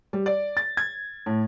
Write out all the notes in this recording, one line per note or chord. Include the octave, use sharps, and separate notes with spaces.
G3
D5
A6
G#6
A2